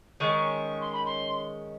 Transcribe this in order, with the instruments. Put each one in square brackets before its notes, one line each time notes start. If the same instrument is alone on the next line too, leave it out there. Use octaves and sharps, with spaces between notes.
[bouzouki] D#3 G#3 C#4 [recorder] C#6
[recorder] C6
B5
C6